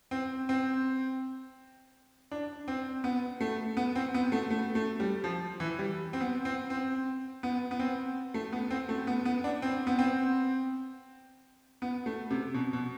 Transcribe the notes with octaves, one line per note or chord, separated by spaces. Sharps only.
C4
C4
D4
C4
B3
A3
B3
C4
B3
A3
A3
A3
G3
F3
E3
G3
C4
B3
C4
C4
B3
B3
C4
A3
B3
C4
A3
B3
B3
D4
C4
B3
C4
B3
A3
C3
B2
B2